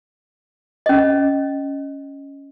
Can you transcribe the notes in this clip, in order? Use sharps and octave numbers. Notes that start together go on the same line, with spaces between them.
C#4 D#5